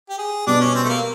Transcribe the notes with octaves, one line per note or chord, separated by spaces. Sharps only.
G4
G#4
B2 G3 B3 D4
C#4
C4
A3
A#3